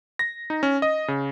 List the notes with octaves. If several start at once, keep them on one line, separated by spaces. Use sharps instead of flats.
A#6
D#4
C#4
D#5
C#3